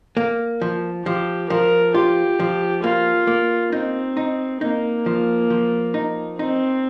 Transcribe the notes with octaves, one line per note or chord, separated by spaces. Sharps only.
A#3
F3
F3 G4
F3 A#4
F4 G4
F3
A#3 F4
A#3
C4 D#4
D#4
A#3 D#4
F3
F3
D#4
C4 D#4